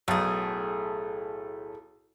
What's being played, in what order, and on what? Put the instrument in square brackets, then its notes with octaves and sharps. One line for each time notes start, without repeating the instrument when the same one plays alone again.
[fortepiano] B1 [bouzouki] A2 G#4